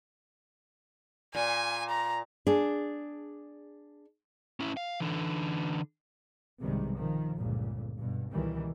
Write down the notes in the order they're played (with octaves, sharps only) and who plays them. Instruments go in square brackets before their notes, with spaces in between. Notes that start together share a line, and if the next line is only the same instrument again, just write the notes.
[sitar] A#2 [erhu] G#5
[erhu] A#5
[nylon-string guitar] D4 G#4
[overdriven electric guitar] C#4 E4
F5
D3 E3
[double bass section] B1 G2 C3 D#3 G3 G#3
D#3 F3
G1 C#2 A#2
G2 B2
C#2 B2 D#3 E3 G3